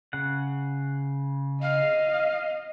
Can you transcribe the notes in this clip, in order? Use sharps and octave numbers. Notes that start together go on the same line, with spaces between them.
C#3 F#5
D#5 F5